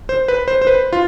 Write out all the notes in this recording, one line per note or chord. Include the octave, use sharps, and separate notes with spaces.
C5
B4
C5
C5
B4
F4